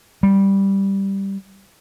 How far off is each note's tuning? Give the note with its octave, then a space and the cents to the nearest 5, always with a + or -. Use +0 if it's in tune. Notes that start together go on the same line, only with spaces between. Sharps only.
G3 +0